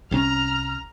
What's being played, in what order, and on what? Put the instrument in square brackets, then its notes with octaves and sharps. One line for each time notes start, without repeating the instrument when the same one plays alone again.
[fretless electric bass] C2 C3 C#4 [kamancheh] A#5 F6